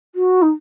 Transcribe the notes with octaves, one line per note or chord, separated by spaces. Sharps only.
F#4
D#4